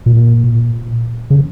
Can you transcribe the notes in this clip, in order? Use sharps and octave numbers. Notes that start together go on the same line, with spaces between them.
A#2
C#3